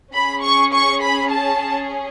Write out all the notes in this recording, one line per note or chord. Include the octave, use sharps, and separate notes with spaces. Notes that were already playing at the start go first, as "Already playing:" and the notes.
C#4 G#4 B5
C#6
C#6
B5
A5